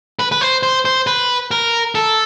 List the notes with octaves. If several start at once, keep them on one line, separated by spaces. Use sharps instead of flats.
B4
B4
C5
C5
C5
B4
A#4
A4